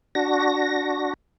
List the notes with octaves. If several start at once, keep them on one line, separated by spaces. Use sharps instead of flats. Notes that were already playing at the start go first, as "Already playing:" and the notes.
D4 F#4 A#6